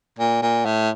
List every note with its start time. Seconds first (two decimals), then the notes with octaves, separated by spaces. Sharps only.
0.19 A#2
0.42 A#2
0.65 A2